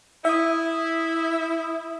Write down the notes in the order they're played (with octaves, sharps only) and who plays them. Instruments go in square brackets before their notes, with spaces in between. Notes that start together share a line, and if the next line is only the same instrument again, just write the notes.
[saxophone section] E4 [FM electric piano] E5 D#6